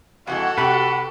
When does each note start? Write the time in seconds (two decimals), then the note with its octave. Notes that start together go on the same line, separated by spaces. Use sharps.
0.27 F2 E3 G#3 F#4 A4 F#5
0.58 C3 G4 B4